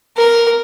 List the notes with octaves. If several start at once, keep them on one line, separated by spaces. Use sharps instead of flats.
A#4